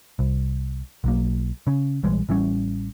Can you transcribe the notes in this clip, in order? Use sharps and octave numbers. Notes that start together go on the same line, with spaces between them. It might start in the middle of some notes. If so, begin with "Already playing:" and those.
C2
B1 F#3 A#3
C#3 C#4
A#1 E3 G3 G#3
A1 E3 G3 C#4